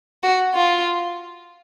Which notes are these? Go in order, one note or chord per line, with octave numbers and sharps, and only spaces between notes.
F#4
F4